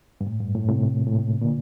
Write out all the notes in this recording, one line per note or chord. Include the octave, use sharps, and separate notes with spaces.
G2
A2
G2
A2
A2 C3
A2
A#2
A#2 D3